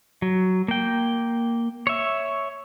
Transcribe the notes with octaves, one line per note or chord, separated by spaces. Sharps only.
F#3
A#3 G5
C#5 E5